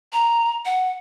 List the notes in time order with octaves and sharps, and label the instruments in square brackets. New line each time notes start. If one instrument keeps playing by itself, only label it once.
[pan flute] A#5
F#5